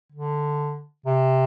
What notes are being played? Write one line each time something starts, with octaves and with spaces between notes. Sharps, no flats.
D3
C3